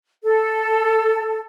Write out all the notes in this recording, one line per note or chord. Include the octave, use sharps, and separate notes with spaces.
A4